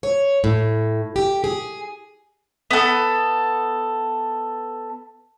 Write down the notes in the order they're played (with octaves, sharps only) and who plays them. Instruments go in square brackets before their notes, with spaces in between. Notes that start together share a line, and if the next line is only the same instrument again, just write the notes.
[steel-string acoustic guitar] C#5
A2
G4
G#4
[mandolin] B3 A4